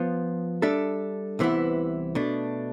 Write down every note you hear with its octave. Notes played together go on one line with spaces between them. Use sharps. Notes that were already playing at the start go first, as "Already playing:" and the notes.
Already playing: F3 B3 F4
G3 D4 A4 E5
C2 C3 E3 B3 E4
B2 A3 D4